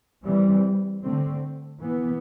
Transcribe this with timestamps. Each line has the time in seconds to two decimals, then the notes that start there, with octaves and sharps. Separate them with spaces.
0.25 E3 G3 C4
1.04 D3 A3 C4
1.83 E3 B3